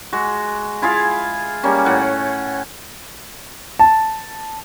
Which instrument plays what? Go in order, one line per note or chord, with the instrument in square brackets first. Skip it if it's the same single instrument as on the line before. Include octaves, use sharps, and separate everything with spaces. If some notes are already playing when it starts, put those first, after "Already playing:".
[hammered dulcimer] G#3 F#4
E4 F4 G#4 F5
G3 A#3 C#4
A2 F#5
[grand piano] A5